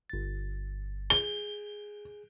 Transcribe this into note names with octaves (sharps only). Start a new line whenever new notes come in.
G1 A6
G#4 G7